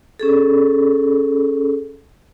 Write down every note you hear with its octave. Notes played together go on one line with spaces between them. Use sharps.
C#4 G#4 A4